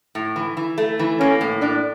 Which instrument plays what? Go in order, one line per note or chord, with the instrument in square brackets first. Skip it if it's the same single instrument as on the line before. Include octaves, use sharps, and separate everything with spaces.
[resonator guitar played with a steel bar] A2
E3
E3
A3
E3
[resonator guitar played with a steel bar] A#3 [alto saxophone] C#4
[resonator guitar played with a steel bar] A2
[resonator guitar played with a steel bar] A2 [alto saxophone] D4